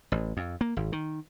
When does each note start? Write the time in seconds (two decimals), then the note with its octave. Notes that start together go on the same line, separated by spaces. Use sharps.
0.12 A1
0.37 F2
0.61 A#3
0.77 G#1
0.92 D#3